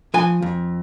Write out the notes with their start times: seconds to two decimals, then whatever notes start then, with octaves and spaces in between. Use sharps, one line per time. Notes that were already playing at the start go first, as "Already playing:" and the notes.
0.14 F3 G#5
0.42 F2